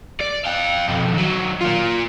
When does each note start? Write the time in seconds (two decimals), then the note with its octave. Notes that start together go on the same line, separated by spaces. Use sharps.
0.21 D5
0.46 F5 G5
0.89 B1 F2
1.14 D#3 F#3
1.61 A#3 F4